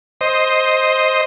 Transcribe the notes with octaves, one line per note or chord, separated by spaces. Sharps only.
C5 D#5